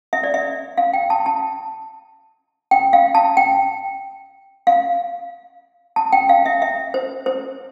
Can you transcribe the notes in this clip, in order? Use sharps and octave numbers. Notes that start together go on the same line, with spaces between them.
E5
D5
E5
F5
G5
A5
A5
G5
F5
A5
G5
F5
A5
G5
F5
E5
E5
C5
C5